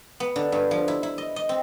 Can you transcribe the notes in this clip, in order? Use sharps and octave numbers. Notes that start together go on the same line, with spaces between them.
B3
D3
G2
F3
E4
E4
D#5
D#5
C4